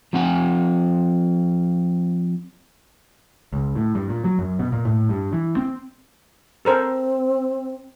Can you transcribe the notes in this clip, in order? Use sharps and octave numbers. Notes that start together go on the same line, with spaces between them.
F3 C4 F#5
C#2
A2
G2
A#2
F#3
F#2
B2
A#2
A2
G2
E3
C4
C4 A4 A#4 C5